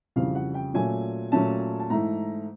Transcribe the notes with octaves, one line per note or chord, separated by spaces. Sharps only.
F2 C#3 E3 G3 F5
F#5
G5
A#2 F#3 A3 C#4 G#5
A#2 F#3 A3 C#4 A5
A5
G#2 E3 A3 A#5